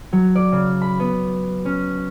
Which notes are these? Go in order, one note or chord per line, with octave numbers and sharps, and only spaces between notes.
F#3
D5
C#3
B5
B3
C#4